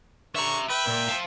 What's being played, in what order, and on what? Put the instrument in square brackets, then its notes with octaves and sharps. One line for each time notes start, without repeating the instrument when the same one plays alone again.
[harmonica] D3 C#6 [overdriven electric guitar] E5 A#5
[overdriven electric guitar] B4 [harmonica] E5 G5
[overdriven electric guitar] A#2
F5 A5